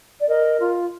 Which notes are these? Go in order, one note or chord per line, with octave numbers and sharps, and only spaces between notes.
D5
A#4 D#5
F4